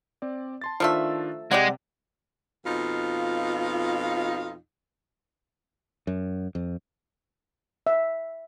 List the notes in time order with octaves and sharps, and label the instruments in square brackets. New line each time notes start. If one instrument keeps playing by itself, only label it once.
[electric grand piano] C4 D5
A5 C6 A6
[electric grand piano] D#3 D4 F4 [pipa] F3 A3 E5
[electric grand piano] C3 [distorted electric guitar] G#3 [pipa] G4 D5 F#5
[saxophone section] F2 B2 D#4 F4
[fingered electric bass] F#2
F2
[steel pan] E5